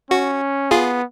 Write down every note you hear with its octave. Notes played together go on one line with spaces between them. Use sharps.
C#4 F#4
B3 F4 G#4